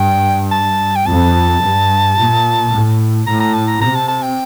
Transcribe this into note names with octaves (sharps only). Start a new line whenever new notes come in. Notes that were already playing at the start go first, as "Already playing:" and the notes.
Already playing: G2 G5
A5
G5
F2 A5
G2
A#2
A2
A2 A#5
A#5
A5
A#5
C3 A#5
A5
A5
G5